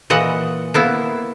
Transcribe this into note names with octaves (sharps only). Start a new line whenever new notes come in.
A#2 E3 D#5 F#5
A#3 B3 E4